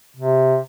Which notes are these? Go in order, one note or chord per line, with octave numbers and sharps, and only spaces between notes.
C3